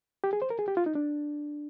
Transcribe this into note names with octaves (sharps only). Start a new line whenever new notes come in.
G4
G#4
C5
A#4
G#4
G4
F4
D#4
D4